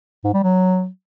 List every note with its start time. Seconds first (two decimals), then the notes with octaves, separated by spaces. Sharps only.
0.24 G#2
0.34 G3
0.43 F#3